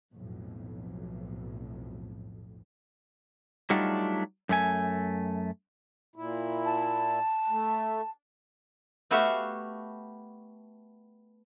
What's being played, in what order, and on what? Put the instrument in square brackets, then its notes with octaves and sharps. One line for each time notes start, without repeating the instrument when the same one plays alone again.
[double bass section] B1 F2 A2
[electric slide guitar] F#3 G3 A3 D4 D#4 F4
F#2 A3 G#5
[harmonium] A#2 E4
[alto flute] A5
[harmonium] A3
[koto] A3 B3 F#4 G4 E5 F5